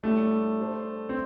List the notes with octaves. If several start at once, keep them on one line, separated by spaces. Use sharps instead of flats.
A2 G3 A3 D4
G3 D4 A4 C5
C4